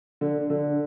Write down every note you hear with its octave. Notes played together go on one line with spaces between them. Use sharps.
D3
D3